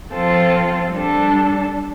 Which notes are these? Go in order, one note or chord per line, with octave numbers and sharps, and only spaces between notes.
F3 C4 F4 A4
G3 D4 A4